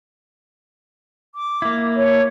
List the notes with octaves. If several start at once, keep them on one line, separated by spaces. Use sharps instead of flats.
D6
A#3 E4
C#5